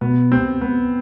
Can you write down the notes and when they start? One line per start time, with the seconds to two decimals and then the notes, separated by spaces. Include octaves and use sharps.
0.01 B2 B3
0.32 C4
0.61 B3